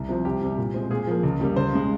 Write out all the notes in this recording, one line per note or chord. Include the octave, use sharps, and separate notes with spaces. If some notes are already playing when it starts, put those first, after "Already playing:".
Already playing: C2
C3 F3 C4
C2 G4
C3 G3
A#2
G#3 C4
A#2 G#4
F3 A#3
C#2
C#3 G3 A#3
C#2 C5
C#3 G#3